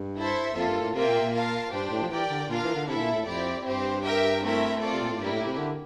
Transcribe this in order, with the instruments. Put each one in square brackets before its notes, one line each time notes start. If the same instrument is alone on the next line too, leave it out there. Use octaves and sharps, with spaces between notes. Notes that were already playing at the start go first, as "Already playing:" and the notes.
Already playing: [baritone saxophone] G2
[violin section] E4 A4 C5 E5
[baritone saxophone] F2 [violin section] A#3 F4 A4
[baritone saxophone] G2
A2
[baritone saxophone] C3 [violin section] A#3 F4 A#4 E5 G5
[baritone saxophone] A#2
A#2
[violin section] F4 A#4 F5 A5
[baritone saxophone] G2 [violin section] D4 G4 C5 G5
[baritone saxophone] A2
F3
[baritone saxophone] E3 [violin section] G4 A#4 D5 G5
[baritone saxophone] D3
[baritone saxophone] A#2 [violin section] D4 F4 A#4 F5
[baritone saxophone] E3
D3
[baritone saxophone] C3 [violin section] E4 A4 E5
[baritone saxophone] A2
A#2
A2
[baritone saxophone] F2 [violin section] C4 E4 G4 D5
[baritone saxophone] G2 [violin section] C4 G4 C5
[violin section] G4 A#4 E5 G5
A3 C4 E4 A#4 E5
C4 F4 A4 D5
[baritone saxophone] C3
A#2
A2
[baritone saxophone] G2 [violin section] A#3 E4 G4
[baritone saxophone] A2
C3
D3